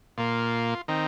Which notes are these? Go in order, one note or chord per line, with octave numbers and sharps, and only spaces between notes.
A#2 A#3 F4
D#3 C4 D#4